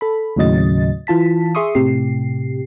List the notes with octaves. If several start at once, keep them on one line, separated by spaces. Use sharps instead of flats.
A4 B5
D#2 A2 C#3 F#3 D#5 A6
E3 F4 A5 B6
G#4 E5 C6 C#6 D#6
A2 C3 G4 C7